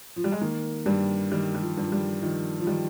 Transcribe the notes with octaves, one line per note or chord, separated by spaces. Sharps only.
F3
G3
G#3
D#3 A#3
G2 G3
D#3 G3
G3
F3
G2
F3
G3
D#3 F3
F3
D#3 G3